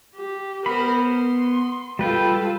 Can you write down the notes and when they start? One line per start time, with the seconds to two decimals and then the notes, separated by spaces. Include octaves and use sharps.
0.15 G4
0.66 B3 A#4 C5 B5
1.03 C6
1.99 G3 F4 A4 B4 G5